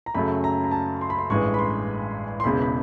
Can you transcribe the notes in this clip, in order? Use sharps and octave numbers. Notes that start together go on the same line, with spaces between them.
A#5
F#2 C#3 F#3 A3 B5
A#5
A#5
A5
C6
B5
C6
A1 G2 E3 G#3 C#6
B5
C6
C6
E1 E2 C#3 B5
B5